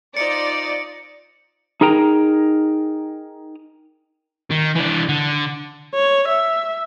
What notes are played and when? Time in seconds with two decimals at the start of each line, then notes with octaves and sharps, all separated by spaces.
0.17 D#4 F4 C5 D5 C#7 D7
1.81 D#4 G#4 A#4 G5 A#5
4.51 D#3
4.75 E3 D4
5.09 D3
5.94 C#5
6.29 E5